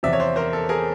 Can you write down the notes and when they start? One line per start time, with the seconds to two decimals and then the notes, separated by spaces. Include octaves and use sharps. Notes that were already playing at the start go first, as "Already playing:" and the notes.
0.03 E2 C3 F3 D5 E5
0.13 C#5
0.20 C5 D5
0.36 A#4 C5
0.53 A4
0.69 G#4 A#4